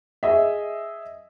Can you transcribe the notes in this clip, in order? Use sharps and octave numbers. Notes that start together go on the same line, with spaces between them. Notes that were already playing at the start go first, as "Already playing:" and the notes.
G#4 D#5 E5